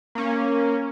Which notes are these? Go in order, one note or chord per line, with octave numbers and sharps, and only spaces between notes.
A#3 C#4